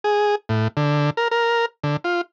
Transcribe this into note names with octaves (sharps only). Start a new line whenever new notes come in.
G#4
A2
D3
A#4
A#4
D3
F4